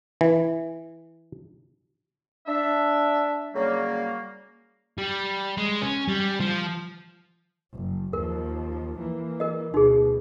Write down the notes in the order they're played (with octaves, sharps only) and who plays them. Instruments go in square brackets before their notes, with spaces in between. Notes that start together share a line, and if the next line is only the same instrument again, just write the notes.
[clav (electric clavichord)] E3
[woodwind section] D4 E5
C#3 F#3 G3 A#3
[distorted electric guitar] G3
G#3
C#4
G3
F3
[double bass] F#1
[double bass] D#2 F3 [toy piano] A#4
[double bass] E3 A#3
[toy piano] A#4 D#5
[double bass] D2 B2 [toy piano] D#4 G#4